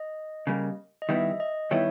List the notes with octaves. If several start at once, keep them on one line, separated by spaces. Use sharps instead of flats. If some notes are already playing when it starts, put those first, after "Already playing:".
Already playing: D#5
C#3 G3 A#3
D#5
D#3 G3 B3 E4 E5
D#5
D#3 G3 B3 E4 C#5